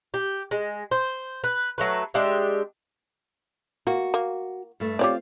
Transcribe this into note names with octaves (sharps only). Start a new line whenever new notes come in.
G4
G#3
C5
B4
F#3 A3 B4
G#3 D4 G4 E5
A#3 F#4
A#3
G2 A3
C4 F4 G4 C#5 D5 F5